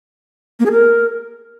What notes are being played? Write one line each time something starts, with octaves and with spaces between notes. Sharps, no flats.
A#3
G#4
A#4